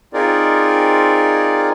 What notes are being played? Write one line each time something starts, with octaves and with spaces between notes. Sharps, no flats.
C4 D#4 F4 G#4 A#4 D5